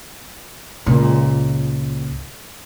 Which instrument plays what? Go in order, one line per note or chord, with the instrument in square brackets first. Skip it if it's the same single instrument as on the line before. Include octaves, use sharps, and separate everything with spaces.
[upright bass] C#2 A#2